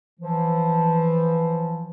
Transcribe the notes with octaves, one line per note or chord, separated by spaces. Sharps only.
E3 F3